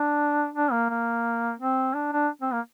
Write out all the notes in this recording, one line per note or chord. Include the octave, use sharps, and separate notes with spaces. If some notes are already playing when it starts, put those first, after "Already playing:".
Already playing: D4
D4
A#3
A#3
C4
D4
D4
C4
A#3